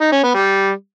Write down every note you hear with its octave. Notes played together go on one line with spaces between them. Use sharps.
D#4
C#4
B3
G3